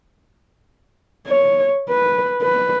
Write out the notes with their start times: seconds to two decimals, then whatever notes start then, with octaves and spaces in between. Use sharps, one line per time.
1.27 C#5
1.90 B4
2.43 B4